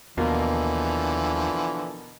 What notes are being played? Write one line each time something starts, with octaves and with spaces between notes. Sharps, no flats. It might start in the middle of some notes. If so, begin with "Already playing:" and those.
D#2 B2 D3 E3 F3 A#3